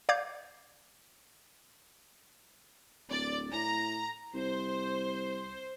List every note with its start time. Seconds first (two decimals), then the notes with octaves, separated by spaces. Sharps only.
0.09 D5 F5 D6 G6 G#6
3.09 D1 D5
3.52 A2 A#5
4.34 C2 C5